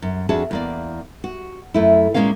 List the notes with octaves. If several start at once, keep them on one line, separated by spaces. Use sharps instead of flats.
F#2
F2 D4 F#4 G#4 E5 A5
E2 A#3 D5
F#4
F#2 A3 E4
A#2 E3 G#3 A#3 C#4 F5